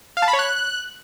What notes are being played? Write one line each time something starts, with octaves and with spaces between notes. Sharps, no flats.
F5
A5
B5
C#5
F#6